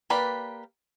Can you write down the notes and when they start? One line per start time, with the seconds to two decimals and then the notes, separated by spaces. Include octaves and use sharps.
0.10 A#3 G4 B4 D5